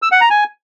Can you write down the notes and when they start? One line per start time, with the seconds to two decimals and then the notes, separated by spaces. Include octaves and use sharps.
0.02 E6
0.12 F#5
0.21 A#5
0.30 G#5